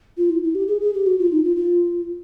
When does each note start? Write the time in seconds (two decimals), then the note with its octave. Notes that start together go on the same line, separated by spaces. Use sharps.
0.17 F4
0.29 E4
0.43 E4
0.55 G4
0.68 G#4
0.81 G#4
0.94 G4
1.06 F#4
1.19 F4
1.32 D#4
1.44 F4
1.56 F4